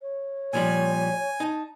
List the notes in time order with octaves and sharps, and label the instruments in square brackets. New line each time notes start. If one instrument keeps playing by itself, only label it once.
[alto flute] C#5
[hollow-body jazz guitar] A#2 F3 G3 [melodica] G#5
[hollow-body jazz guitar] D#4 [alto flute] A5